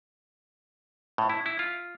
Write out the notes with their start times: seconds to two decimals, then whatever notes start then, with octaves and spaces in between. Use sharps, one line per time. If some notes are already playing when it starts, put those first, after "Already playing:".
1.18 A2
1.29 E4
1.46 E4
1.59 F4